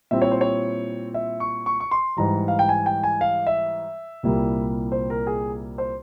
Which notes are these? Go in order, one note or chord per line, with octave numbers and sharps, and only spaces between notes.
A#2 G3 C4 E4 E5
C#5
C5
C#5
E5
C#6
C#6
C#6
C6
G#2 E3 G3 A#5
F5
G5
G#5
G5
G#5
F5
E5
C2 A#2 G3 A#3 E4
C5
A#4
G#4
C5